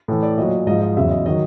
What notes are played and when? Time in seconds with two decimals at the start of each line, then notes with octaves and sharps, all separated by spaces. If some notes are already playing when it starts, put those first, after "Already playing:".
0.08 A2 E3 A4
0.23 D5
0.37 A#2 F#3 D#5
0.67 G#2 F3 D#5
0.82 D#5
0.97 E2 C#3 F#3 E5
1.11 D#5
1.26 D#3 F#3 D#5